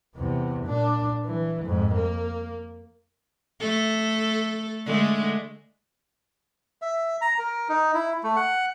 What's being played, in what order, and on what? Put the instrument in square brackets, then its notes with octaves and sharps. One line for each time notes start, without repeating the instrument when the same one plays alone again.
[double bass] E2 C3
A#2 D4
E3
F2 G#2
A#3
[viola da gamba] A3 A4
D3 G#3 A3
[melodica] E5
A#5
A#4
D#4
E4
A3
F#5